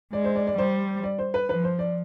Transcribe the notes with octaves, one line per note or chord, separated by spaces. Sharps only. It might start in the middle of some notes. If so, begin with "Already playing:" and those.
G#3 D5
C5
D5
D5
G3 C5
D5
C5
B4
F3 B4
C5
D5